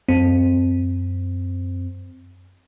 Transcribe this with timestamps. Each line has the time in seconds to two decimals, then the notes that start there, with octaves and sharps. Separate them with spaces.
0.09 F#2 C4